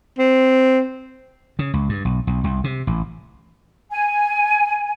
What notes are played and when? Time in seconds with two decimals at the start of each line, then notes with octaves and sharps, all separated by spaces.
0.18 C4
1.59 C#3
1.74 C#2
1.89 G2
2.05 B1
2.27 B1
2.44 C2
2.64 C3
2.87 A1
3.90 G#5